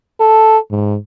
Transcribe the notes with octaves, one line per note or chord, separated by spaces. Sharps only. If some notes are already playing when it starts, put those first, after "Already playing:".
A4
G#2